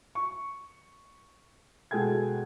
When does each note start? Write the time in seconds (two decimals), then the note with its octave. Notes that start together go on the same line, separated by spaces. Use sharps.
0.15 C#6
1.91 B2 G#3 G#4 A4 G5 G#6